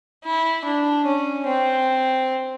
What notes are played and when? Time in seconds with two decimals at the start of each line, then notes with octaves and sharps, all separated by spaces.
0.24 E4
0.65 D4
1.05 C#4
1.46 C4